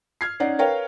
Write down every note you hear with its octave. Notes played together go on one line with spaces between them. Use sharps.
F6 G#6 C7
C#4 D#4 D5 F#5
A#4 B4 C#5 F5 G5